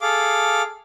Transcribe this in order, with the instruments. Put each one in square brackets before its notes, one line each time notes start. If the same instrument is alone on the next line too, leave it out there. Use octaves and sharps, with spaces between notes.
[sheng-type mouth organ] G#4 A4 F5 D6